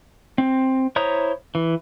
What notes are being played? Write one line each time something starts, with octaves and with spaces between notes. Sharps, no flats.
C4
E4 C5 C#5 A#5 D#6
E3